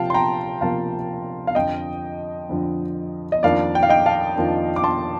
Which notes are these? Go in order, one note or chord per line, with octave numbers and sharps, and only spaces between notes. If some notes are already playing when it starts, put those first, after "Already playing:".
Already playing: C3 F3 A#3 F4 F5 G5 A5
C6
G5 A#5
C3 F3 A#3 F4 F5 A5
F5
F2 D3 F3 D#5 G5
F2 D3 F3
D#5
F2 D#3 A#3 D4 F4 D5 F5
G5
F5
D#5 G5
F5 A5
F2 D#3 A#3 D4 F4
D6
A5 C6